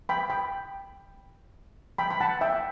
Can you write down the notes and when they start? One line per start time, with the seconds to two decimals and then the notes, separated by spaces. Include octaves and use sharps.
0.09 G5 B5
0.30 G5 B5
1.98 G5 B5
2.11 B5
2.21 F#5 A5
2.41 E5 G5